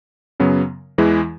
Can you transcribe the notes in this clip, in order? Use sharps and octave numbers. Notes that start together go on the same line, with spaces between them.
F#2 C#3 F#3 B3
E2 E3 G#3 E4